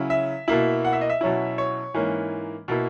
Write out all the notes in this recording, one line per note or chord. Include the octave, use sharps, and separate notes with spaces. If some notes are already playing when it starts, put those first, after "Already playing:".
Already playing: C#3 F#3 C#4 E4
E5
B2 A#3 E4
F#5
E5
D#5
E5
B2 F#3 C#4 E4
C#5
G#2 E3 A#3 C#4
B2 A#3 E4